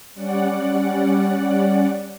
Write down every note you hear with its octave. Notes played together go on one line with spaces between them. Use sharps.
G3 C#4 D5 F#5